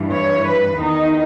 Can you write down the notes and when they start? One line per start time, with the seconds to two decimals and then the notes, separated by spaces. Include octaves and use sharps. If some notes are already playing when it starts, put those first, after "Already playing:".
Already playing: G2 E3
0.13 C#5
0.46 B4
0.80 E2 D#3 D#4